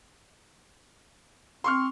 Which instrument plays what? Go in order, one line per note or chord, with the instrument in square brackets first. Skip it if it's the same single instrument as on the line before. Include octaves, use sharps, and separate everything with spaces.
[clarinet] C4 [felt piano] C6 C#6 F6